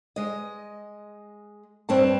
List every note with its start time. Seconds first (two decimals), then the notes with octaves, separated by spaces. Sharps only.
0.16 G#3 D#5
1.89 G2 C4 C#5 A5